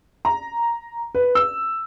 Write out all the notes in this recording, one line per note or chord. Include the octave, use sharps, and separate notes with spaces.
A#5
B4
E6